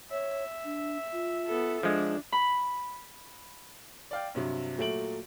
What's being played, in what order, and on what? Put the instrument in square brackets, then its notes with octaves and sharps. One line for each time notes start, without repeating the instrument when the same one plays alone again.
[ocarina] C#5 [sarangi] E5
[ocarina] D4
F4
[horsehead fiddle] B3 A4
[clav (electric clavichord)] F3 G#3 [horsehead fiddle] D4
[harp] B5
[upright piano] D5 F5 G5
G2 C3 F#3
A#2 F#3 A3 D7 F#7